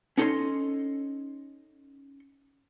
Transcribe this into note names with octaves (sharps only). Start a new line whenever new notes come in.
C#4 D#4 A4 C#5 D#5 C6